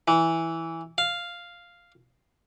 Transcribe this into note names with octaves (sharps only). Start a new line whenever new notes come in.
E3
F5